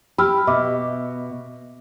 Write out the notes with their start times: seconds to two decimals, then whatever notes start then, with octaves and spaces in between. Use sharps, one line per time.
0.18 G4 B5 E6 F6
0.47 B2 D#5 E5 D6